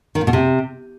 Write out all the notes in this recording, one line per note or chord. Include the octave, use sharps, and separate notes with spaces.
D#3
A#2
B2
C3